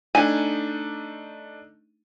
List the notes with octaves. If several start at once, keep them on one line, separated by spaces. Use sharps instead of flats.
A3 D4 D#4 G#5